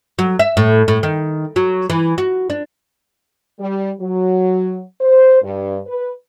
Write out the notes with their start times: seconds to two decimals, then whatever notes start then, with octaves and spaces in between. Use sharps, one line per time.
0.19 F#3
0.39 E5
0.57 A2
0.88 A2
1.03 D#3
1.56 F#3
1.90 E3
2.18 F#4
2.50 D4
3.59 G3
4.00 F#3
5.01 C5
5.42 G2
5.87 B4